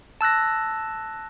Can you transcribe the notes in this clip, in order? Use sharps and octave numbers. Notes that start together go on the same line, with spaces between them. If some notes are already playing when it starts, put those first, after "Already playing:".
A5 E6 F#6 A#6